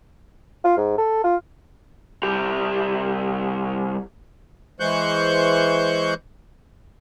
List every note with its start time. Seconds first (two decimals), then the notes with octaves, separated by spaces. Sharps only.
0.64 F4
0.77 G#2
0.98 A4
1.24 F4
2.23 C2 G4
4.80 E3 G#3 C5 C#6 F#6 G6